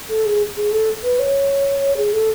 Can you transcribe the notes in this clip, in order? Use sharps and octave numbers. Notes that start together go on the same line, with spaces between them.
A4
G#4
G#4
A4
B4
C#5
G#4
A4